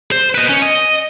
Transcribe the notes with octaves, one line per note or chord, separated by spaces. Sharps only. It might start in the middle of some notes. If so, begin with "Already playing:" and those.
C5
B4 D#5
C#4
D#5